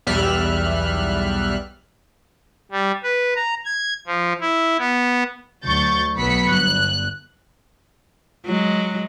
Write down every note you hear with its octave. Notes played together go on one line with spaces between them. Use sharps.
B1 E2 G3 E5 F6 F#6
G3
B4
A#5
G#6
F3
E4
B3
D2 F#3 C#6 G6 A6
B1 F#3 B3 B5 B6 C#7
G1 F#6
F#3 G#3